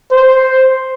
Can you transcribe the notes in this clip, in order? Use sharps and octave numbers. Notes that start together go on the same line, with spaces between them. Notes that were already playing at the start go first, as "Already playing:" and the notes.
C5